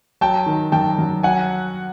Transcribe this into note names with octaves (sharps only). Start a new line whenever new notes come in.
F#3 G5 A5
D#3
F#2 G5 A5
F#2
F#3 F#5 G#5